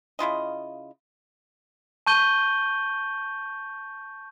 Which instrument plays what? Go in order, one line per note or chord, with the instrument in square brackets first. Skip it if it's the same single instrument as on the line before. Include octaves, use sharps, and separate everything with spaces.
[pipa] C#3 E4 F4 D#5
[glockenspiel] A5 C#6 G6 D#7 G7